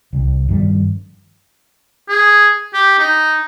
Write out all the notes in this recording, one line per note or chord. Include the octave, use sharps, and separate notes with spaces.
C2
G2 D#3 F3 G3
G#4
G4
D#4